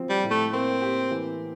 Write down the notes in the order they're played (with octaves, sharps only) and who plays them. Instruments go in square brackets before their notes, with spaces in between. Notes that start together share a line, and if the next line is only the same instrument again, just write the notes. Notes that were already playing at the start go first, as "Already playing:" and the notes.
Already playing: [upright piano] F3 C4
[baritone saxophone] G3
[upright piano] A2
[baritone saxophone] A3
[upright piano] A#3 [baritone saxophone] C4
[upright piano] G4
E3